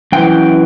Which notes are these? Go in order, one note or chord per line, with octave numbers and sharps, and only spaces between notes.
F#2 E3 G5